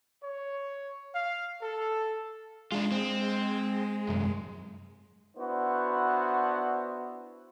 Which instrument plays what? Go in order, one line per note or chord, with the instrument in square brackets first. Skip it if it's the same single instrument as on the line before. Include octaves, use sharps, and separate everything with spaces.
[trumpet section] C#5
F5
A4
[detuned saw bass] G#3 [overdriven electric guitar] D4 F4
[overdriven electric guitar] C4
C2 F#2
[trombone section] B3 D4 E4 F#4 C5